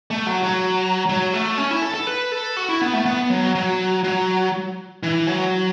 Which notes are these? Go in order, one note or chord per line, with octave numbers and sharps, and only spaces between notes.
A3
F#3
F#3
F#3
A3
C#4
E4
A4
A4
B4
A4
F#4
E4
B3
A3
B3
F#3
F#3
F#3
E3
F#3